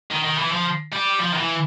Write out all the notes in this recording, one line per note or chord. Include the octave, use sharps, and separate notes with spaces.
D#3
D#3
E3
F3
G3
F3
D#3
E3